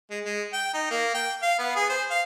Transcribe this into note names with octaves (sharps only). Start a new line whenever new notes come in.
G#3
G#3
G5
D#4
A#3
G5
F5
B3
G#4
C5
F5